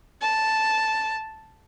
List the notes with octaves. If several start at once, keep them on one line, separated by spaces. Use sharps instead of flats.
A5